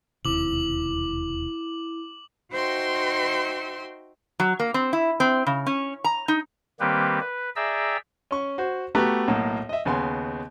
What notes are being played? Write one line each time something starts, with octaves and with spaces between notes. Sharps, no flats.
E1 D#2 C3 E4 D6 F#7
D#4 F#4 C5 E5 G5 C6
F#3
A#3
C4
E4
C4
C#3
C#4
A#5
D#4
D#3 G3 A#3 C4 G4 B4
B4
G#4 D5 E5 G5 A#5 E6
C#4 C#6
F#4 C5
A3 B3 F#4 G4 B4 A#5
B1 A2 A#3
D#5 E5
D#2 C#3 B3 G#5 C6